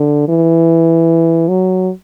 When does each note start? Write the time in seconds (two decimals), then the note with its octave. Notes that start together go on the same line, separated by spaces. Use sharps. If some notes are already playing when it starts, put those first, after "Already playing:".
Already playing: D3
0.29 E3
1.49 F#3